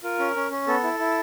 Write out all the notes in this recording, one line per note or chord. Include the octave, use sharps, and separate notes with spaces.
F4 A#4
C#4
C#4
C#4
B3 A4
E4
E4